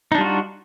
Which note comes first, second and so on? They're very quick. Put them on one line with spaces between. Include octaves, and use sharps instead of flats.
D#4 D4 G3 F4 F#4